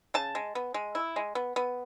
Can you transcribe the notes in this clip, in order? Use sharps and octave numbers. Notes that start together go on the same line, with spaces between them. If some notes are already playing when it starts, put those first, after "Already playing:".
C#3 A5
G#3
B3
G#3
E4
G#3
B3
B3